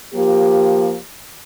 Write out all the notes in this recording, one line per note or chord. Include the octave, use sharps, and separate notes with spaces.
F3 A#3 G4